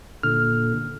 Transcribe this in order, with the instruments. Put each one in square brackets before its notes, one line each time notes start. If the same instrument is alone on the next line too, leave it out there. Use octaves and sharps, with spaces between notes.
[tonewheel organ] A#2 D3 [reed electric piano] F6